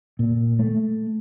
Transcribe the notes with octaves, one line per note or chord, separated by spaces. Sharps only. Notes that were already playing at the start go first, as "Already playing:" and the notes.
A#2
A3